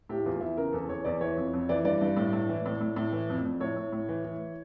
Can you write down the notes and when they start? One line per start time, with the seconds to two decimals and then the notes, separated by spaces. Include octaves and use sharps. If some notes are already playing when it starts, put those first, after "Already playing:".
0.09 A2 G4
0.18 E4
0.25 E2 F4
0.41 E2 E4
0.57 C#3 A#4
0.73 E2 A4
0.89 E2 C#5
1.05 E2 D5
1.21 E3 C#5
1.37 F2
1.53 F2
1.69 E3 D5
1.85 G2 D5
2.01 G2
2.17 A2
2.33 A2
2.49 E3
2.66 A2
2.81 A2
2.96 A2
3.12 E3
3.30 F2
3.45 F2
3.60 A2 C#5
3.76 A2
3.92 A2
4.09 E3
4.25 E3